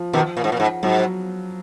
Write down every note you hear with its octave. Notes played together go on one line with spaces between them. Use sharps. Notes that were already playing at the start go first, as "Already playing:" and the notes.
Already playing: F3
B2 D#3
A#2
G#2
A#2
G#2
G#2 F#3